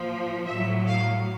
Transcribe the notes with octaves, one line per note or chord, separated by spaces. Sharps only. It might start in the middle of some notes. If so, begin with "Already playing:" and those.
Already playing: A#2 F3
A2 F#3 E5
F5